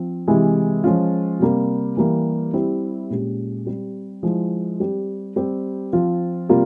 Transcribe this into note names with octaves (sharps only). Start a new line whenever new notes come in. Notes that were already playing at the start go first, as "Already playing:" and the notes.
Already playing: F3 C4
C3 E3 G#3 E4 G4
F3 G#3 C#4 F4
C3 G3 A#3
E3 G3 A#3
G3 C4 E4 G4
A#2 G#3 C#4 G4
G3 C4 G4
F3 G#3 E4
G3 C4 G4
G3 C4 G4
F3 C4 F4
C3 G3 A#3 F4